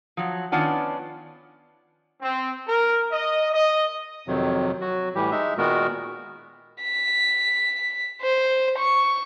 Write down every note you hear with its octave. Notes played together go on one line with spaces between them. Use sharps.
F3 F#3
D#3 B3 C#4 D4 F4 F#5
C4
A#4
D#5
D#5
F2 C3 D#3 F#3
F#3 F#4
A2 E3 G3 G4
G#3 D#4 E5
A#2 D#3 G#3 B3 F#4 A#4
B6
C5
C#6